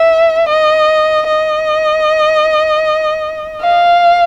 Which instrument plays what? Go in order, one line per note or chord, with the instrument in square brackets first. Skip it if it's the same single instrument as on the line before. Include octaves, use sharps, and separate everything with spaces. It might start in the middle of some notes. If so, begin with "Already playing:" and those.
Already playing: [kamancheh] E5
D#5
D#5
F5